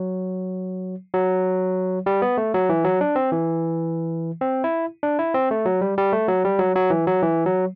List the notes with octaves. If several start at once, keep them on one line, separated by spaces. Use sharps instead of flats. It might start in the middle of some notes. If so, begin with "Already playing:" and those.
Already playing: F#3
F#3
G3
B3
A3
F#3
E3
F#3
D4
C4
E3
C4
E4
D4
E4
C4
A3
F#3
G3
G3
A3
F#3
G3
F#3
F#3
E3
F#3
E3
F#3